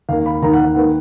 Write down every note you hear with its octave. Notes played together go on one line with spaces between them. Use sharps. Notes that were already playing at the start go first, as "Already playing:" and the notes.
D#2 D#3 A#3 F5
B5
D#2 D#3 A#3 A#5
F#5
F#5
D#3 A#3 B4